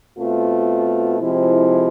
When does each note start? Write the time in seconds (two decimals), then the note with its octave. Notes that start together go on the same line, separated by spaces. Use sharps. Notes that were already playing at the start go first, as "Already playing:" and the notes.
0.17 B2 A3 C4 F4
1.18 C3 F3 G#3 C4 E4